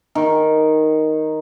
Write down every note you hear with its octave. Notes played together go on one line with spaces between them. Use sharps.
D#3